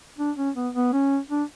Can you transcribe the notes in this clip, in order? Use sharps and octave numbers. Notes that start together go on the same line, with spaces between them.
D4
C#4
B3
B3
C#4
D4